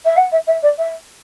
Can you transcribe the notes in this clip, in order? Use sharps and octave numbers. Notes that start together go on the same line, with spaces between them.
E5
F#5
E5
E5
D5
E5